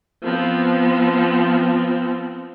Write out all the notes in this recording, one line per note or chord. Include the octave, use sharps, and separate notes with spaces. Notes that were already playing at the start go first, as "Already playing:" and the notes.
F3 B3 C4